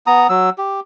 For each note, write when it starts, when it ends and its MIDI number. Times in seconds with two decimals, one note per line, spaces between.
0.07 0.27 59
0.07 0.27 82
0.07 0.27 87
0.29 0.50 54
0.29 0.50 88
0.58 0.80 67